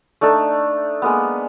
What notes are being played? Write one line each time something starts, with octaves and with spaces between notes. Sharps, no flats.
A3 D4 D#4 A4
G#3 A#3 B3